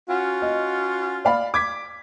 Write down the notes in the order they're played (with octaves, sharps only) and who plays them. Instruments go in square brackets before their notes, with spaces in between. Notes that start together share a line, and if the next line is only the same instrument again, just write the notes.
[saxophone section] C#4 F4 F#4
[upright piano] D#5
D5 F5 B5
D6 G#6 B6